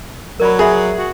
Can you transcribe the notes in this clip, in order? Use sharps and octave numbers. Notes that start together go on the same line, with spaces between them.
F#3 A#4 D5 B5
G#4 E5 B5
F#4